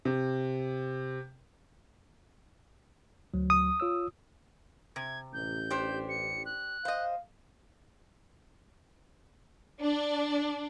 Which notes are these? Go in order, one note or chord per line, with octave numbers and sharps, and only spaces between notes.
C3
D2 F#3
D#6
F4 C#5 E6
C3 G#6
A1 G6
D4 G4 C5
C#7
F#6
C5 D#5 F5
D4